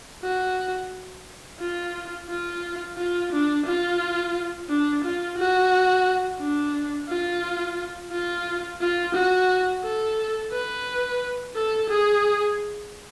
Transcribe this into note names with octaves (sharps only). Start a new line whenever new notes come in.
F#4
F4
F4
F4
D4
F4
D4
F4
F#4
D4
F4
F4
F4
F#4
A4
B4
A4
G#4